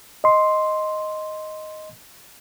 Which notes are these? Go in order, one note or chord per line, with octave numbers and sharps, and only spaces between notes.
D#5 C6